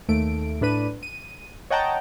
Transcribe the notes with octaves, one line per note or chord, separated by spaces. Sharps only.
D#2 A3 D7
A2 D4 B4 D#7
D#7
C#5 D#5 F#5 G5 A5 A#5